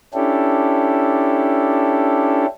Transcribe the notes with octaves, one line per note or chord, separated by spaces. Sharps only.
C#4 D4 E4 G4 A4